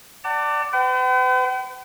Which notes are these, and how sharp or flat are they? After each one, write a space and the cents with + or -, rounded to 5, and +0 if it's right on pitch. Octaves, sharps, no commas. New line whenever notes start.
D5 +0 F#5 +30 A5 +35
B4 +45 G5 -45